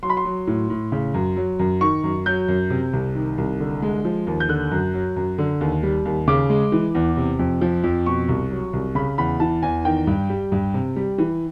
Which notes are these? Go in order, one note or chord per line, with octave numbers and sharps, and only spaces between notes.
F#3 C6
B5
C6
F#3
A2
A2
C#3
F#2
F#3
F#2
D#3 C#6
F#2
F#3 G6
F#2
C3
C2
D#3
C2
D3
G#3
F3
D#2
G6
D3 F#6
F#2
F#3
F#2
D3
D#2
G3
D#2
C#3 D6
G#3
E3
E2
C3
F2
F3
F2
B2 C#6
C2
F#3
C2
C#3 B5
E2 B5
E3 A5
E2 G#5
D#3 G5
G2
G3
G2
C3
G3
E3